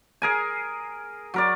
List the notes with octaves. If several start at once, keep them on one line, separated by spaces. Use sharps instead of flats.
G#4 A#4 G#5
F#3 A#4 D5